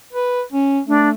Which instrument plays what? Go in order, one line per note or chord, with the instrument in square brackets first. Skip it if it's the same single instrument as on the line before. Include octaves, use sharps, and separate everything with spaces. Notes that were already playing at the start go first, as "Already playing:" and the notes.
[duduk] B4
C#4
[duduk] A3 [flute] D4